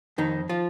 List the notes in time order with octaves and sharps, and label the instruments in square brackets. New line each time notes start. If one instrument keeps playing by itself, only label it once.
[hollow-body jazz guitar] F2 D#3 D#4
F3 F4